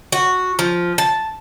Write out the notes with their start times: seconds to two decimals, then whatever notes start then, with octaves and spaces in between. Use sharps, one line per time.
0.12 F#4
0.59 F3
0.98 A5